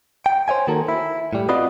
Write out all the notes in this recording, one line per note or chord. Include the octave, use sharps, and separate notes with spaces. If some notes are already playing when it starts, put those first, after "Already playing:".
G5
C5 C#5 E5 G#5
D#3 A#3 F#4 A4 A#4
E4
A2 G3
C4 F4 F#4 B4 D5 D#5